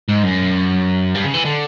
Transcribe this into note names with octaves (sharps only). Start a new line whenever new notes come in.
G#2
F#2
G2
C#3
E3
D3